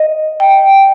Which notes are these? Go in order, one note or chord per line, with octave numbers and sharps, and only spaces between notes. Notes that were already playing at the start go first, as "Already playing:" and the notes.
Already playing: D#5
G5